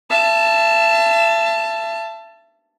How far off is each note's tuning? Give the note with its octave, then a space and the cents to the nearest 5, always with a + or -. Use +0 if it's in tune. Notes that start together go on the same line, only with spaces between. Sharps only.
E5 +35 A5 +0